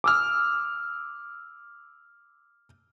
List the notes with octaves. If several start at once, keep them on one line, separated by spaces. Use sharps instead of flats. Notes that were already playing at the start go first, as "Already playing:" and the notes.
D6 E6 F6